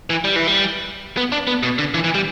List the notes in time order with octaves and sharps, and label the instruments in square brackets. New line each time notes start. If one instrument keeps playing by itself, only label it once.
[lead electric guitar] E3
G3
E3
G3
B3
D4
B3
B2
D3
E3
E3
G3